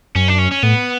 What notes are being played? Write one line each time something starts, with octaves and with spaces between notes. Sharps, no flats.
F#2 C#4
D4
C#4
C#4
A2 B3